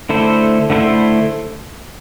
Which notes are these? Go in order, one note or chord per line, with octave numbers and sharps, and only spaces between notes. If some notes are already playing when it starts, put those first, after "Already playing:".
D3 A3 E4 A4 C5
D3 A3 E4 A4 C5